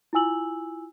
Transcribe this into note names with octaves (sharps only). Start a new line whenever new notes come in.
E4 F4 G#5 E6 F#7